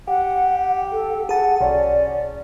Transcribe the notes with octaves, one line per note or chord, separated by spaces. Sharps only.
G4 F#5
A4
G#4 F#5 A5
B1 C#4 D5